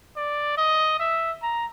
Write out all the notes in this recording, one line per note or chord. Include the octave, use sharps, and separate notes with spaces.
D5
D#5
E5
A#5